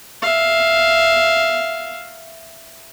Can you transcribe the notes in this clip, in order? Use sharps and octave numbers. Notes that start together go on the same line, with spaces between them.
E5 F5